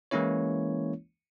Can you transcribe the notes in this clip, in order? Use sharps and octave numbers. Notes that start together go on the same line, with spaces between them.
E3 G#3 A#3 C#4 E4 C#5